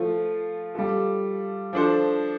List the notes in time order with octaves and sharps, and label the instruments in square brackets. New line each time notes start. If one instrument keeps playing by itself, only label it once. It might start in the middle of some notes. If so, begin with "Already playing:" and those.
Already playing: [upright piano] F3 A3 F4
G3 F4 A4
F3 D4 A4 C5